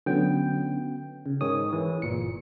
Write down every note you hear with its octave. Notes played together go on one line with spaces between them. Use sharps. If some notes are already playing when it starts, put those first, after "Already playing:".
D3 F#3 B3 C#4 G5
C#3
G#2 D#3 G#4 C#5 D#6
E3
G1 A#2 C#7